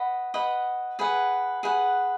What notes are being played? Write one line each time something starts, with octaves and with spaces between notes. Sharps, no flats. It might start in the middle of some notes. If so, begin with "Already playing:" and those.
Already playing: B4 D#5 F#5
B4 D#5 F#5
G#4 B4 F#5
G#4 B4 F#5